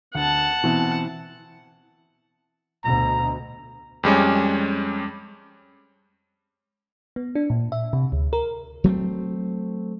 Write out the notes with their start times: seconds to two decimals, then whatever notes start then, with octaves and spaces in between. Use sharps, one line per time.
0.15 D2 F#5 A5
0.64 B2 E3 C4
2.84 D2 B2 A#5
4.03 F2 G3 G#3 C#4
7.16 B3
7.35 D4
7.50 A#2
7.72 E5
7.93 C3
8.12 D2
8.33 A#4
8.84 F#3 A3 B3 C4